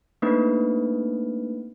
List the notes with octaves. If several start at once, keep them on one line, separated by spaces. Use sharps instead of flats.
A3 A#3 C4 D4 D#4 B4